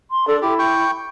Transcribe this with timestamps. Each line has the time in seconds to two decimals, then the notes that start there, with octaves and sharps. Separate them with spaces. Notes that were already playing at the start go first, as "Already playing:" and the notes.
0.11 C6
0.27 D4 A4
0.42 E4 G4
0.59 G5 C#6